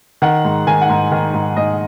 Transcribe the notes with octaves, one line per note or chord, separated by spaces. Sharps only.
D#3 F#5
G#2
D#3 G#5
F#5
G#2
D#3
G#2
G#2 D#5